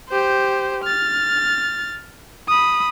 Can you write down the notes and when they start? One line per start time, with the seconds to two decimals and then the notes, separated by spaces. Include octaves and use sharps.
0.10 G4 C5
0.85 F6 A6
2.49 B5 D#6